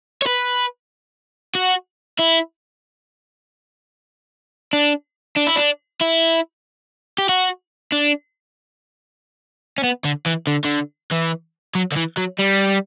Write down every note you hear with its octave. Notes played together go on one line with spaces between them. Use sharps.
C#5
B4
F#4
E4
D4
D4
E4
D4
E4
G4
F#4
D4
C#4
B3
D3
E3
D3
D3
E3
F#3
D3
E3
F#3
G3